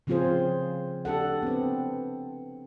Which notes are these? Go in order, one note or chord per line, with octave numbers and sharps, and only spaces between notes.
C#3 F3 C4 F4 G#4 C5
D4 G4 A4 F#5
B3 C4